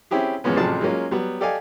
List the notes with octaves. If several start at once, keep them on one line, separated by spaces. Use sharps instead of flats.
C4 C#4 E4 G4 G#4
E2 G#2 F3 B3 C#4
A1 C3 F3 F#3 G#4 A5
F#3 G#3 A#3 C#4 F4
F#3 G3 B3
G4 A4 D5 D#5 F5 G#5